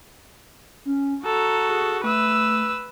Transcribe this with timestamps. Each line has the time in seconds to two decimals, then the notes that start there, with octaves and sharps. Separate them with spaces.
0.85 C#4
1.24 F#4 A4 A#5
1.69 G#4
2.04 A3 B4 E6